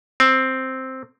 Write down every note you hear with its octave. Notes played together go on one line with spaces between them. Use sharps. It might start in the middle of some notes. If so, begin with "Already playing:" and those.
C4